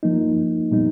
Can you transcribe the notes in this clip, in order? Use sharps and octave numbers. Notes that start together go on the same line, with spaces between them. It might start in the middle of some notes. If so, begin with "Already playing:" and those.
F3 A#3 D#4
A#2 G3 B3 D#4